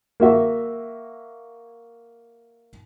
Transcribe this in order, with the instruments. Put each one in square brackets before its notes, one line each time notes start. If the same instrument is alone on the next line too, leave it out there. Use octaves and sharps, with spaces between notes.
[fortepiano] A#3 F#4 E5